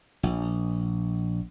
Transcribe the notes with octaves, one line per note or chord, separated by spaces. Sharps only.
A#1